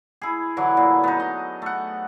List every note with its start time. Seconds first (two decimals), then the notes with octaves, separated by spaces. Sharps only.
0.22 E4 G#4
0.57 D3 E3 F#3
0.77 A#2
1.04 B3 D#4
1.20 D#5
1.62 A3 F#5